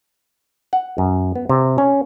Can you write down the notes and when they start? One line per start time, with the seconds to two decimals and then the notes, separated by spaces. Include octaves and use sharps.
0.73 F#5
0.98 F#2
1.35 B3
1.49 C3
1.78 C#4